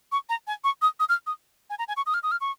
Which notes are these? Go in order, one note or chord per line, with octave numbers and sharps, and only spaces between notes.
C#6
A#5
G#5
C#6
D#6
D#6
F6
D#6
G#5
A#5
G#5
C#6
D#6
F6
D#6
F6
C#6